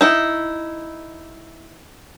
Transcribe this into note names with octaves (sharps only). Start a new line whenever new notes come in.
D#4 E4